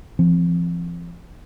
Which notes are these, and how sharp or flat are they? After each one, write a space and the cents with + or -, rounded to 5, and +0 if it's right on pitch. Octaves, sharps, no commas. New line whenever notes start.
F3 -35 C4 +0